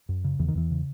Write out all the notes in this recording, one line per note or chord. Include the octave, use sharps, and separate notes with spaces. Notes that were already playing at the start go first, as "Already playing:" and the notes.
F#2
C#3
E2 E3
D#3
E2 E3
C#3